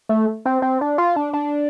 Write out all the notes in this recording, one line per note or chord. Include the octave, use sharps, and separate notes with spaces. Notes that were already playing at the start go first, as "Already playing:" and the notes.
A3
C4
C4
D4
F4
D4
D4